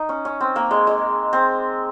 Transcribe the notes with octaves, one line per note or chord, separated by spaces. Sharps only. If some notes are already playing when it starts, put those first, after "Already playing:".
Already playing: D#4
C#4
C#4
C4
A#3
G#3
G#3
C4